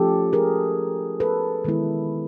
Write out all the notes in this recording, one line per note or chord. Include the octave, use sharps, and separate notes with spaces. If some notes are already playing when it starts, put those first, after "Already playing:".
Already playing: F3 A3 C#4 F4 G4 A4
G#4 A#4
A4 B4
D#3 G#3 B3 E4